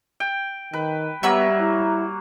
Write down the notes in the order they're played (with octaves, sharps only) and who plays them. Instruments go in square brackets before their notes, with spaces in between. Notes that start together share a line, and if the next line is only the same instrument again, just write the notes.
[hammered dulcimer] G5
[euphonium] D#3 [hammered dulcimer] B4
[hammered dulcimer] F#3 A#3 [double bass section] G3 [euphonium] B3 [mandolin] E5 F#5 E6
[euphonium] E4